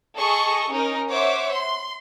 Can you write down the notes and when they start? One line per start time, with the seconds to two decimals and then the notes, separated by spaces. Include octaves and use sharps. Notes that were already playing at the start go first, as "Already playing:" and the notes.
0.16 G#4 A4 D#5 C#6
0.69 C#4 D#4 A#4
1.10 C5 C#5 E5 F#5 D6
1.52 C6